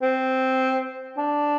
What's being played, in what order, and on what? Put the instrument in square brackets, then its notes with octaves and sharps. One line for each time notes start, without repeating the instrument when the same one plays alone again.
[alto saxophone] C4
D4